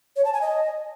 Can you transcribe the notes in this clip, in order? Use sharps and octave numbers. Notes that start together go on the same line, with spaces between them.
C#5
A5
G#5
D#5